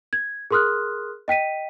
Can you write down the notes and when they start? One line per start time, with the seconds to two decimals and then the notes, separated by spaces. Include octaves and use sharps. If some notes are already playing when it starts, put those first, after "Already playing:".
0.13 G#6
0.51 G#4 A#4 C6 D#6 F6 F#6
1.28 D#5 G5 B6 D#7